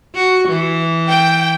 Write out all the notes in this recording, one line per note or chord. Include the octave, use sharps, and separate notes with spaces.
F#4
E3
G5